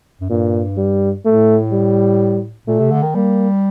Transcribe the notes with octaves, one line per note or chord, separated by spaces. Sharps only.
F#2
G2 A#2
G3
A2 A3
G3
A#2 A3
C3
D3
D#3
G3 A#3